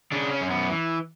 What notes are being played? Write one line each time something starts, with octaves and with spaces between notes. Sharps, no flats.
C#3 D4
C#4
F#2
B3
E3